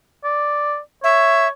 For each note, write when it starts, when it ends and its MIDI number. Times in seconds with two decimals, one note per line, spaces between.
0.24 0.79 74
1.04 1.49 73
1.04 1.48 76